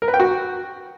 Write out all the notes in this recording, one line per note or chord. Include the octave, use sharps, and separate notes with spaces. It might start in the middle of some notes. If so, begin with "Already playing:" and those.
A#4
B4
G5
F#4